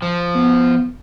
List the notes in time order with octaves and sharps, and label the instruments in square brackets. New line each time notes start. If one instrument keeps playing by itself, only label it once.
[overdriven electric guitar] F3
[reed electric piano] B3